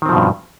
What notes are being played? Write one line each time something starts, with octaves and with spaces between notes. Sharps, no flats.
G2 B2 D#3 F3 C4